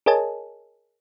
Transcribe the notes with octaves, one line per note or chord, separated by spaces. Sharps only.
G#4 A#4 C#5 D#5 G#5 A5